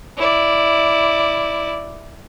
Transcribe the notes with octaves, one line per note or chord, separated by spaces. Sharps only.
E4 D5